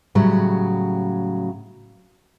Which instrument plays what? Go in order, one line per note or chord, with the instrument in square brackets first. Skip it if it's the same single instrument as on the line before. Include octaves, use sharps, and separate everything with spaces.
[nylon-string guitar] A2 C#3 F#3 G3